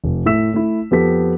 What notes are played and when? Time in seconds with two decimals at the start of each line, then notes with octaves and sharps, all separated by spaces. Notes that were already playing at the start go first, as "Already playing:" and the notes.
0.04 F1
0.26 A2 A3 E5 E6 B6 E7
0.54 A3 E4
0.91 F2 B3 G4 A4 B6